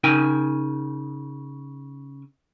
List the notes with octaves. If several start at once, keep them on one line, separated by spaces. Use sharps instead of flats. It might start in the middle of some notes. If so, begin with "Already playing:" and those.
C#3 D#4 A#4 G5 G#5